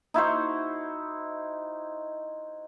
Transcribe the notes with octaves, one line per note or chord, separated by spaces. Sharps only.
D#4 E4 F#4 C5